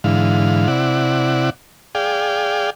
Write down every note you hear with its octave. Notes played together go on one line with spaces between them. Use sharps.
G#2 D3 E3 F5
C3 E4 D5 F#5
G#4 D5 F5 G5